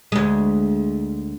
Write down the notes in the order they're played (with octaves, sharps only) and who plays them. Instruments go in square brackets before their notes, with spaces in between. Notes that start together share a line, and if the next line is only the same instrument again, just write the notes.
[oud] D2 G#3